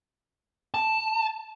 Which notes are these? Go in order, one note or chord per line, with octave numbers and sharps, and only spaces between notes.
A5